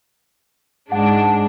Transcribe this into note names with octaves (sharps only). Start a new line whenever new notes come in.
G#2 G#3 D4 F#5